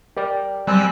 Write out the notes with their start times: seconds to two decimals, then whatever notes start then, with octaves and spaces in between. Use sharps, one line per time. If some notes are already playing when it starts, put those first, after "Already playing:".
0.17 G4 A#4 D5 G5
0.67 F#3 G3 C4 G#5 E6 F#6